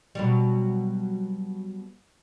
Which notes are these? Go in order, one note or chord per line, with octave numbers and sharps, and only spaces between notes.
B2 F#3 G3